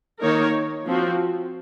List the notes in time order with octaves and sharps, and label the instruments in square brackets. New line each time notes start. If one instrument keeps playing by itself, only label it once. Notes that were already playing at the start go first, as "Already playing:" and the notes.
[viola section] D#3 A#3 D#4 A#4 C#5
F3 C4 F#4